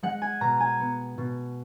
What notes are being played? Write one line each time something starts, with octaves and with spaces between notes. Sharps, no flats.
G#3 F#5
G#5
B2 A#5
G#5
B3
B2